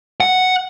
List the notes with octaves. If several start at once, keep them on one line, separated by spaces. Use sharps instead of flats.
F#5